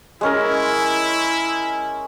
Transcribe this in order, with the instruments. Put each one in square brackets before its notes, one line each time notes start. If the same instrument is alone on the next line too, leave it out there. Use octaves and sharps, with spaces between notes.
[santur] G#3 C#4 A#4 [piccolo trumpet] E4